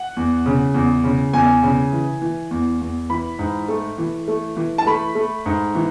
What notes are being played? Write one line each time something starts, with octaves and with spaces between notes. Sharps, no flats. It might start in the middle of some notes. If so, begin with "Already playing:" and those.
Already playing: F#5
E2
C#3
E2
C#3
E2 G#5
C#3
E3
E3
E2
E2
E3 B5
G#2
A3
E3
A3
E3
A5
A3 B5
A3
G#2
E3